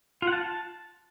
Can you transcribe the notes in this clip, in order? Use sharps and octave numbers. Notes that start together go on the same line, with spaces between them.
F4
F#5
A5